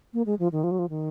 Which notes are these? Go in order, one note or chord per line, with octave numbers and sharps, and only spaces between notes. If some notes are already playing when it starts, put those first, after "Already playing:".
A#3
G#3
F3
D#3
F3
F#3
F3
D#3